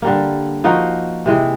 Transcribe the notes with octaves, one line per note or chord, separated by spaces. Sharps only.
D3 G3 A#3
F3 A#3 D#4 F#4
C3 E3 G#3